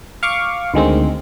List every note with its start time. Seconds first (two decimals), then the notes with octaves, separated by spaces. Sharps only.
0.23 F5 C#6 D6
0.74 D2 D#3 G#3 C4